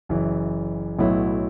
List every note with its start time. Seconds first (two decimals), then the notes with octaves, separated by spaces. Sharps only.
0.09 F#1 F#2 E3
0.98 B1 A2 F#3 B3 E4